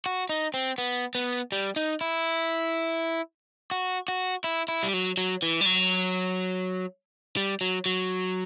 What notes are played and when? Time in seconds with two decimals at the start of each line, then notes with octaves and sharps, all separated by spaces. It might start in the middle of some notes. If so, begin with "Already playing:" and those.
0.06 F#4
0.29 D#4
0.54 C4
0.78 B3
1.15 B3
1.52 G3
1.76 D#4
2.01 E4
3.71 F#4
4.08 F#4
4.44 E4
4.68 E4
4.83 G3
4.94 F#3
5.17 F#3
5.42 E3
5.61 G3
5.66 F#3
7.37 G3
7.61 F#3
7.86 F#3